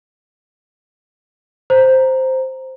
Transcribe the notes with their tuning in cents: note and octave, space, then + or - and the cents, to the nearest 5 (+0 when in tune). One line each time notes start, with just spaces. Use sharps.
C5 +0 A#5 +0